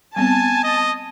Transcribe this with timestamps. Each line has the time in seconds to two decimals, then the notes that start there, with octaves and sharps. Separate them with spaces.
0.16 G3 B3 C4 G#5 A5
0.64 D#5